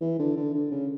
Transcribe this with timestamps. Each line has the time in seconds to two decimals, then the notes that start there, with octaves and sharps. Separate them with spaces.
0.01 E3
0.19 D3
0.36 D3
0.54 D3
0.71 C#3